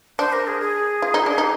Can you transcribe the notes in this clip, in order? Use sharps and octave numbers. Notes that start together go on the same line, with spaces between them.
D4 C5
A#4
G#4
G#4
F4
D#4
D4
D#4 G4